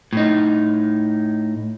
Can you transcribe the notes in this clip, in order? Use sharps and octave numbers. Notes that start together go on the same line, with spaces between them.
A2 D#4